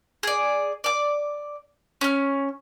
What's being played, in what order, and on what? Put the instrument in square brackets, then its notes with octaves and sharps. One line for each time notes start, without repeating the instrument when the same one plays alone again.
[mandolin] G#4 D5
D5 D6
C#4 F6